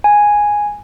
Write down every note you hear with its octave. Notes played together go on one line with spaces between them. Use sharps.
G#5